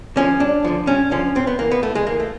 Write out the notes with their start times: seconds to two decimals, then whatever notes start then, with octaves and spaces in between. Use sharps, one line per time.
0.16 D3 F3 C#4
0.40 G2 D4
0.65 D3 F3
0.87 G2 C#4
1.11 D3 F3 C#4
1.35 A2 C4
1.47 B3
1.59 E3 A#3
1.71 B3
1.83 A2 A3
1.95 G#3
2.07 E3 A#3
2.20 A3